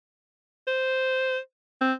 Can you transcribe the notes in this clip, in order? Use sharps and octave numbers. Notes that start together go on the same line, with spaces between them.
C5
C4